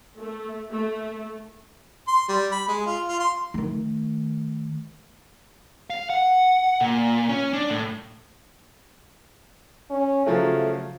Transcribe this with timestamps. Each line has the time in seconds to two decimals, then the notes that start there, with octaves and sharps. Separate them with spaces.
0.19 A3
0.72 A3
2.08 C6
2.29 G3
2.52 B5
2.68 G#3
2.86 F4
3.08 F4
3.20 C6
3.54 D#3 A3
5.90 F5
6.10 F#5
6.81 A#2
7.29 C#4
7.53 D4
7.70 A2
9.91 C#4
10.26 C#3 F3 F#3 A3